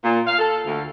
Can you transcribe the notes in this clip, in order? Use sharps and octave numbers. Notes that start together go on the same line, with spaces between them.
A#2
F5
A4
D2